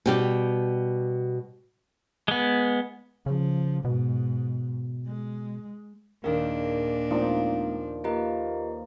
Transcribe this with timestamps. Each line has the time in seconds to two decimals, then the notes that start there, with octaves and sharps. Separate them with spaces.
0.06 B2 G3 G4
2.28 G#3 B3
3.26 C#3 F3
3.85 G#2 B2
5.07 G#3
6.24 D#2 A#2 D4 G#4 A#4 F5 G5
7.11 F3 A3 B3 D#4 D5 G5
8.04 A#3 F4 G4 B4 D#5